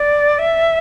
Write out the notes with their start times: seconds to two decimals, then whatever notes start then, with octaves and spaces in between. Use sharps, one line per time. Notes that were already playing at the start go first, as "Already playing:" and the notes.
Already playing: D5
0.39 E5